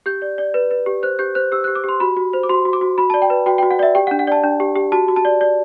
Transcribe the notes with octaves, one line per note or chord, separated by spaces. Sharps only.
G4 G6
D5
D5
B4
B4
G4
C5 F#6
G4 G6
C5 F#6
G4 E6
F#6
G4
D6
G4 C6
F#4 B5
F#4
C5
D6
F#4 C6
F#4
D6
F#4
F#4 B5
A5
D5
G5
B4
F#4 G5
G5
F#4
F#5
D5 E5
G4 G5
F#5
D4
F#5
D5 A5
D4
G4
G4
F#4 A5
F#4
A5
D5
D5